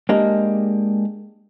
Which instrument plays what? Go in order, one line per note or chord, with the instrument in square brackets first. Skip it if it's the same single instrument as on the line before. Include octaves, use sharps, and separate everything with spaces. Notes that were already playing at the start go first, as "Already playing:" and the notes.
[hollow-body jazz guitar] G#3 A#3 D4 G4